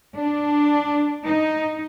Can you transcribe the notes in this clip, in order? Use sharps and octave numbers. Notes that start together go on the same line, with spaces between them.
D4
D#4